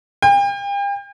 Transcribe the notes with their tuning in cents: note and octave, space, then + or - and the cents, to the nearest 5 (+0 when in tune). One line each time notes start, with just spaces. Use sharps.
G5 +40